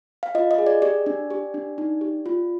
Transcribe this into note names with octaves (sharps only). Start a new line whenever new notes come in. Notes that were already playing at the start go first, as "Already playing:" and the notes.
F5
F4 D#5
D#5
G#4
D5
G4 D5
D4
G4
D4
D#4
G4
F4